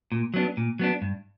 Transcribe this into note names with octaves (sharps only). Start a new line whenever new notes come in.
A#2
F#3 B3 D4
A#2
F#3 B3 D4
G2